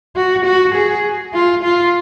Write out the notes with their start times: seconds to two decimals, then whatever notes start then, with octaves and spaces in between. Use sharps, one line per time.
0.16 F#4
0.45 F#4
0.74 G#4
1.33 F4
1.63 F4